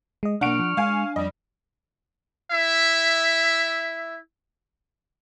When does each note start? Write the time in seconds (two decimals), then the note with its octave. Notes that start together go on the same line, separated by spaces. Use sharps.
0.23 G#3 D#5
0.41 B1 A#3 D4 F#5 C#6 F6 D7
0.59 F3
0.77 G#3 F5 G#5
1.16 F2 G3 D#5
2.52 E4 E5